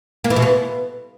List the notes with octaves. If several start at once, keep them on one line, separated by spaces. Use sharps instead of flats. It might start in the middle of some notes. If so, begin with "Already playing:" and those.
A#3
E3
B2
B3